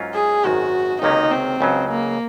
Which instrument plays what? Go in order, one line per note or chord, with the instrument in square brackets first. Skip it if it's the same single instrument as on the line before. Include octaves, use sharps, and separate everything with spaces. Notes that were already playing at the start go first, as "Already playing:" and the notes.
Already playing: [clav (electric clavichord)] G#2 F#3 C#4 F4 A#4
[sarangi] G#4
[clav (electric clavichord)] G#1 F#2 D#3 G#3 [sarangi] F#4
[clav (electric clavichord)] C#2 C3 D#3 A#3 C#4 [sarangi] D#4
[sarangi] C4
[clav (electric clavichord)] C#2 C#3 F#3
[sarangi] A#3